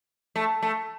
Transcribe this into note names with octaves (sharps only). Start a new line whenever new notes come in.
A3
A3